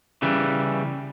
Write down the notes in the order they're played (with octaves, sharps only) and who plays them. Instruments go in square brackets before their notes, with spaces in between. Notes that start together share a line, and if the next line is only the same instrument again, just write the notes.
[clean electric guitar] C#3 E3 G3